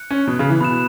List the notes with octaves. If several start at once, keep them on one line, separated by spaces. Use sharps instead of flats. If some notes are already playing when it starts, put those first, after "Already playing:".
Already playing: F#6 C#7
C#4
B2
C#3
E3
B2 B5 F#6 E7